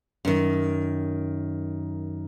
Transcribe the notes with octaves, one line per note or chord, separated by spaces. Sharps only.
F#2 D#3